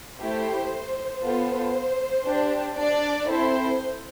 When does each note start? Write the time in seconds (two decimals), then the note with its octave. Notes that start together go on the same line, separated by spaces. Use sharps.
0.19 A3 E4 G4 C5
1.22 B3 F4 A4 C5
2.25 D4 G4
2.77 D4 D5
3.28 C4 E4 A4 C5